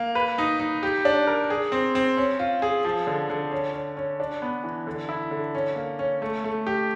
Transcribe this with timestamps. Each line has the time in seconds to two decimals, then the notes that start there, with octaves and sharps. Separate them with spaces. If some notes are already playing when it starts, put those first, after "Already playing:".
Already playing: A#3
0.15 B4
0.38 D#4
0.60 D#4
0.83 G4
1.05 D4
1.27 A#4
1.50 G#4
1.72 C4
1.95 C4
2.17 C#4
2.39 F4
2.62 G#4
2.85 F3
3.07 D3
3.30 D3
3.51 C#4
3.74 C#4
3.97 C#4
4.20 D4
4.42 B3
4.64 E3
4.87 D3
5.09 E4
5.31 D3
5.55 C#4
5.76 A#3
5.99 C#4
6.22 A3
6.44 A3
6.67 G4